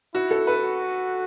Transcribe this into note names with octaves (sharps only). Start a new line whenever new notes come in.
E4 F#4
A4
B4
F#4